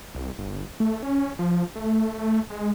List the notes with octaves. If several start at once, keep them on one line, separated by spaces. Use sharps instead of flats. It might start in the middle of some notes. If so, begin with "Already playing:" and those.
C2
G1
A3
C#4
F3
A3
G#3